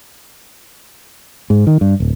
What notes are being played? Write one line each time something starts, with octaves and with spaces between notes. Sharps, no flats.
G#2
D#3
G2
D1